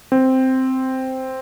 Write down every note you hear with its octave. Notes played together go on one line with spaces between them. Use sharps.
C4